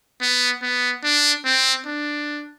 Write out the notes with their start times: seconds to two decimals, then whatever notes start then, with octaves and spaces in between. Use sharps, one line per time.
0.22 B3
0.62 B3
1.04 D4
1.45 C4
1.86 D4